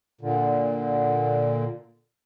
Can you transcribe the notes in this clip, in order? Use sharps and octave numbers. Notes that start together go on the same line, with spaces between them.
A#2 D3